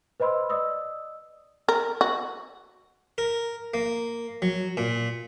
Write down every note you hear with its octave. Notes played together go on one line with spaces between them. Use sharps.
B4 C5 D#5 B5 C6 E6
D5 D#5 D#6 E6
A#4
F#4
A#4
A#3
F#3
A#2